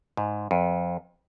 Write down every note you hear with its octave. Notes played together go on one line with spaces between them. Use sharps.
G#2
F2